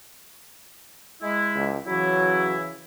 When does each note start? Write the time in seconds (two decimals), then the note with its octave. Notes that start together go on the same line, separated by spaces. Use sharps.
1.22 G#3 E4
1.55 C#2
1.87 C#3 E3 F#3 E4